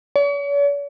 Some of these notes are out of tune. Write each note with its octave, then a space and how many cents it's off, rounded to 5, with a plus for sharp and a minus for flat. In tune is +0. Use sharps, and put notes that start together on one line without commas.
C#5 +45